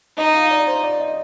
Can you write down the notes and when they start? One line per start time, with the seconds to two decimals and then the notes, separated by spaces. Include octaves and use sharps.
0.18 D#4 D#5
0.34 F5
0.51 D5
0.67 C5
0.83 D5
1.00 D#5